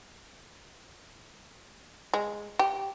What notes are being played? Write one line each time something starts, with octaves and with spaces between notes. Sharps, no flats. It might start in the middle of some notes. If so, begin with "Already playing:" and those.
G#3
G4